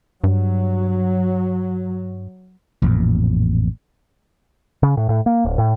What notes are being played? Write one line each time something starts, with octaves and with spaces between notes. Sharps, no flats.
G2 F#3
A1 F2 A#2
C#3
A2
A2
A#3
D1
A2